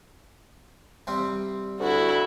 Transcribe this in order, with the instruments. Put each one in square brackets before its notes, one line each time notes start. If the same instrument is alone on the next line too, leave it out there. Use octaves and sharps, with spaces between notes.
[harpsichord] C3 G3 C4
[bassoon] D2 [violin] E4 F#4